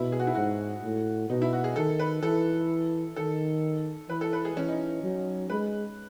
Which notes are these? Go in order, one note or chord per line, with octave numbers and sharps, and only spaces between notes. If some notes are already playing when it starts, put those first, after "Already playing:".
Already playing: B2 E4
G#4
F#4
E4
G#2 F#4
A2
B2 D#4
E4
F#4
G#4
D#3 A4
B4
E3 A4
D#3 A4
E3 B4
A4
B4
G#4
E3 C#4
D#4
F#3
G#3 B4